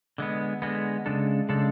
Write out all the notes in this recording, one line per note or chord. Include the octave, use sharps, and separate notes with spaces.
D3 G#3 B3
D3 G#3 B3
C#3 G#3 D4 A4
C#3 G#3 D4 A4